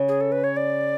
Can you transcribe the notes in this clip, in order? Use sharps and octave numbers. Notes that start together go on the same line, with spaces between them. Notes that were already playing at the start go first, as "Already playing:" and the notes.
Already playing: C#3
G#4
A4
B4
C#5
D5